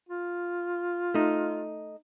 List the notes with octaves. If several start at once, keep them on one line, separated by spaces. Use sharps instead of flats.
F4
A3 D#4